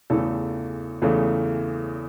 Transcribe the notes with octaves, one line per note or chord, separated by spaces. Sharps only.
E2 C#3 E3 A3 A4
E2 C#3 E3 A3